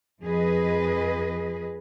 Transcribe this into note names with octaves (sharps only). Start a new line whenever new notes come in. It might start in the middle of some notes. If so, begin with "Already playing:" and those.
F2 F3 G#4 B4 D#5